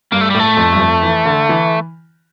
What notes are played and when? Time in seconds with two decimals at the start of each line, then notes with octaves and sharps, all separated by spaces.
0.12 G2 A#3
0.21 A3
0.30 A2 G3
0.39 A3
0.57 F2
0.73 G2
0.79 F2
1.02 E3
1.25 D3
1.49 E3